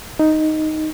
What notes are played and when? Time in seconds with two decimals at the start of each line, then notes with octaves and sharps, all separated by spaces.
0.19 D#4